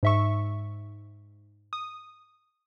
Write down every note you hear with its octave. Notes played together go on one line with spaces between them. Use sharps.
G#2 E5 C#6
D#6